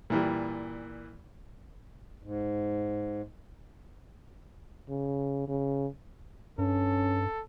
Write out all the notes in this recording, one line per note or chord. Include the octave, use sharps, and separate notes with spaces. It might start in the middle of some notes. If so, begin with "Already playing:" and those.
A#2 E3 G3
G#2
C#3
C#3
G2 C#4 A4